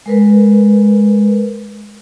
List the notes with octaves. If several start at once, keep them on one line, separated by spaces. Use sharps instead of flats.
G#3 A#4 B4